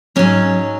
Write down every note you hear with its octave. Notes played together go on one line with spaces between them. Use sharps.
G#2 F#3 C#4